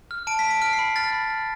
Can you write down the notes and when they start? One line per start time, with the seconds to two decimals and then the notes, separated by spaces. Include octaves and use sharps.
0.11 F6
0.27 A5 D7
0.39 B6
0.44 A5
0.51 D7
0.62 F6 D7
0.73 C7
0.79 B5
0.96 F6 A6
1.13 B5
1.30 F6